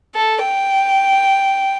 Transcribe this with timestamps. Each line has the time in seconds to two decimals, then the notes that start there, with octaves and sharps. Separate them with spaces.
0.15 A4
0.44 G5